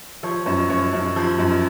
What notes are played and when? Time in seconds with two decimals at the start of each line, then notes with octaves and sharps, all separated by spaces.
0.23 F3 C#5
0.46 F#2 C#5
0.69 F#2 C#5
0.93 F#2
1.16 F3
1.38 F#2